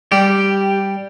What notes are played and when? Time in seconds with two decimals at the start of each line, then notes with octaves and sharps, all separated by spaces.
0.12 G3 G4